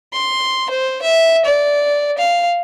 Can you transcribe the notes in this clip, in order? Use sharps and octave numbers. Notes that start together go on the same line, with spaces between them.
C6
C5
E5
D5
F5